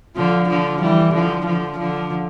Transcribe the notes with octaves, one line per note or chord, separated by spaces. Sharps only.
D3 F3
D3 F3
E3 G3
D3 F3
D3 F3
D3 F3